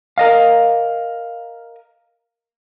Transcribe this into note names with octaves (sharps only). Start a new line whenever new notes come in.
A#4 D#5 F5